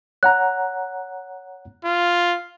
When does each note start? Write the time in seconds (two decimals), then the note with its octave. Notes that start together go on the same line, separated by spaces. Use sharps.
0.23 C#5 F#5 A#5 F#6
1.85 F4